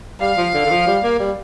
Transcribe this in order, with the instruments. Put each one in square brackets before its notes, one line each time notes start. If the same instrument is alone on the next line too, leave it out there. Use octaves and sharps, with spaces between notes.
[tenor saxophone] G3 [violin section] F5
[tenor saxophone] F3
D3
D3
F3
G3
A#3
G3